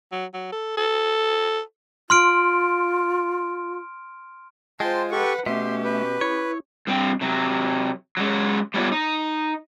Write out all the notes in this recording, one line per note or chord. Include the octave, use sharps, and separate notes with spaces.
F#3
F#3
A4
A4
F4 C6 F6 D7
G#3 F4 C5 G5 A5 C6
G4 A4 B4 F#5 C#6
B2 A3 C#4 G4 E5 C6
B4
E4 C#5
G2 C4 G5
C3 F#3
F#3 G#3 C#4
G3 A3 B3 F4 C#5 D5
D#4